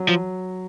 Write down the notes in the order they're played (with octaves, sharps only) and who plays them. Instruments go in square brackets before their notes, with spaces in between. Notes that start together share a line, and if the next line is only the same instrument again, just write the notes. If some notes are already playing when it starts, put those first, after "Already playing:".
Already playing: [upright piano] F#3
[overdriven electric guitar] F3